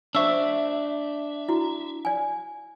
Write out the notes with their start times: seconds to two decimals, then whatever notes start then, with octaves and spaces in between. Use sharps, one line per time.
0.15 D4 C5 E5 C#6 E6
1.49 E4 F#4
2.05 D5 G#5